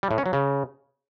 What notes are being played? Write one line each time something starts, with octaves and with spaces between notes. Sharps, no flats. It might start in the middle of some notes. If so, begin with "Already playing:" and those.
G3
A2
C#4
F#3
C#3